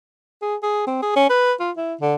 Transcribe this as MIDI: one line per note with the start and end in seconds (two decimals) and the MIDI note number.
0.42 0.56 68
0.63 0.86 68
0.87 1.02 60
1.02 1.12 68
1.16 1.27 61
1.30 1.53 71
1.60 1.71 65
1.77 1.94 64
2.01 2.15 50